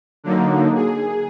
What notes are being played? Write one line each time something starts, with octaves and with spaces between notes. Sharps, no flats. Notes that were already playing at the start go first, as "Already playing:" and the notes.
D3 F#3 A#3 D#4
G#4